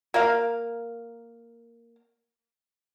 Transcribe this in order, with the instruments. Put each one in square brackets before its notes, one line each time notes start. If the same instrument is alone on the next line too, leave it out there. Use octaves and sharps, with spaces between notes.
[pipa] A#3 A#4 F5